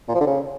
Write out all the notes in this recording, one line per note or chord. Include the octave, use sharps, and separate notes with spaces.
A#2
F3
D3
C#3